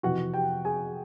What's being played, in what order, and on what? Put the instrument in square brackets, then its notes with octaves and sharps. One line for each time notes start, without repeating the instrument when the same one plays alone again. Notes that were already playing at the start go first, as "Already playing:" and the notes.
[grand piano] F2 C3 E3 F#4 F#5
G4 G5
G#4 G#5